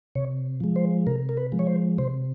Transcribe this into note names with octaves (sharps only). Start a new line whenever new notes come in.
C3 C#5
F3 G#3
C5
C3 A#4
A#4
B4
F3 G#3
C#5
C5
C3 C5